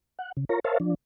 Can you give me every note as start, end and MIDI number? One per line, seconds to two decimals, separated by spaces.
0.19 0.32 78
0.37 0.45 49
0.49 0.60 65
0.49 0.60 70
0.49 0.60 73
0.49 0.60 82
0.64 0.78 70
0.64 0.78 72
0.64 0.78 73
0.64 0.78 76
0.64 0.78 77
0.64 0.78 81
0.80 0.95 53
0.80 0.95 62